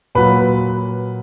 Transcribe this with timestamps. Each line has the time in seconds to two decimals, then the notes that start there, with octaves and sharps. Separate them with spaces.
0.15 A#2 F#3 B4